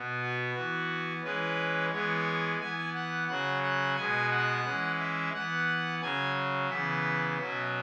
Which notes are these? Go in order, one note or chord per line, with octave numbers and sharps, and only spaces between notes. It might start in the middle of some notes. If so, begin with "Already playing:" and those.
Already playing: B2 B3
F#4
E3 B3
E3 G#3 C#4 B4
E3 G#3 B3 C#5
E3 B3 G#5
F#5
C#3 F#3 C#4 F#5
F#5
B2 G#3 B3 G#5
F#5
E3 G#3 C#4
E5
E3 B3 F#5
C#3 F#3 C#4 G#5
C#3 E3 B3 E5
B2 F#3 C#4